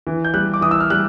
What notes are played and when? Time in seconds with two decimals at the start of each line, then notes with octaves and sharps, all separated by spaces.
0.07 E3
0.24 G6
0.34 G3 F#6
0.54 D6
0.61 E3 D#6
0.71 E6
0.80 F6
0.90 G3 F#6